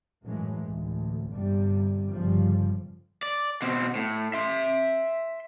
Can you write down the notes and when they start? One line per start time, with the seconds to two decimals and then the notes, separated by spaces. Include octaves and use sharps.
0.24 F#2 A2 E3 G#3
0.64 A1 D2
1.30 G1 G2 C3 G3
2.10 G1 C#3 F3 G3
3.23 D5
3.62 B2 C4
3.96 A2
4.34 E5 C6